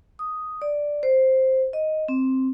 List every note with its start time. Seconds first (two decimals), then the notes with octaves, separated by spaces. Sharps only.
0.19 D#6
0.62 D5
1.03 C5
1.73 D#5
2.08 C4